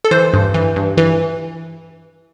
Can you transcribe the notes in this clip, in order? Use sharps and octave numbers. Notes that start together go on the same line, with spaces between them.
A4
E3 C5
G2
E3
G2
E3